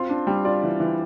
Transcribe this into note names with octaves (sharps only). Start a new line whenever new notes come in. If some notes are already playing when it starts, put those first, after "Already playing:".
Already playing: C4 F4 C6
D4
G3
F4 D5
E3
E3